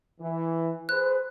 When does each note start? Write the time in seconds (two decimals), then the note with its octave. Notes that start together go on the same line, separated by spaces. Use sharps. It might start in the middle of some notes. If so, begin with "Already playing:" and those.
0.21 E3
0.89 G#4 B4 C5 F#6